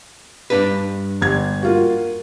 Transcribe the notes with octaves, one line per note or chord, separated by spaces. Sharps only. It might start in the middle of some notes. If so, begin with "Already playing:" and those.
G2 D4 B4
G1 G#6
A#3 F4 F#4